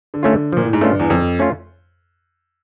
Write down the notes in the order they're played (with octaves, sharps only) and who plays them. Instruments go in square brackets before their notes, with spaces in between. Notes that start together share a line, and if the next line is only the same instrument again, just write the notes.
[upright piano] D3
[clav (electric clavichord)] A3 C#4 F4
[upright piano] D3
[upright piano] A#2 [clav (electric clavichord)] F3
[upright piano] A2
G#2
[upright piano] G2 [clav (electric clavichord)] A3 C#4 F4
[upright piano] E2
[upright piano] F2 [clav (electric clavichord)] F3
[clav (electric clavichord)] A3 C#4 F4